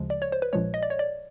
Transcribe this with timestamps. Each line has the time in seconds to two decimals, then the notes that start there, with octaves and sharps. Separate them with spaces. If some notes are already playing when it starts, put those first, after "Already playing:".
Already playing: D2 C#3 F3 G#3
0.10 D5
0.22 C#5
0.32 C5
0.42 B4
0.53 A#1 A#2 F3 G#3 C#5
0.74 D#5
0.83 D5
0.90 C#5
0.99 D5